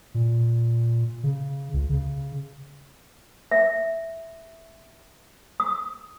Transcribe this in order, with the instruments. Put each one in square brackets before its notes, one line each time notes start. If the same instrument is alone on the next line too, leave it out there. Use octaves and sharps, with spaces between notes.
[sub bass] A#2
C#3
C#2
C#3
[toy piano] E5
D#6